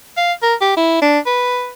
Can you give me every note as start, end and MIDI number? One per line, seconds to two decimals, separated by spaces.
0.17 0.33 77
0.43 0.54 70
0.61 0.74 67
0.77 0.98 64
1.02 1.19 62
1.26 1.71 71